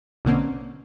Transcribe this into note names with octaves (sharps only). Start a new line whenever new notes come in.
A#1 B2 D3 A#3 C4 C#4